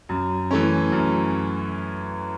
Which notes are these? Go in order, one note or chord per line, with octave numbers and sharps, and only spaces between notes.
F#2
E3 A3 C#4
F#2